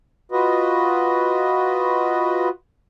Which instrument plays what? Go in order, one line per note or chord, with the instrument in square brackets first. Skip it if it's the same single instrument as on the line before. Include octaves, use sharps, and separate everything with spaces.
[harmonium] F4 F#4 B4 D#5